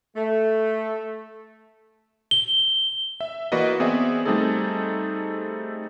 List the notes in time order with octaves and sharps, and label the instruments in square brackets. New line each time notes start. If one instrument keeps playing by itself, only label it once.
[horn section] A3
[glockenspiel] G7
[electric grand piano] E5
E3 A#3 F#4 B4 D5 D#5
B3 C4 G#4 D5 E5
G3 A3 C4 D#4 G#4 A4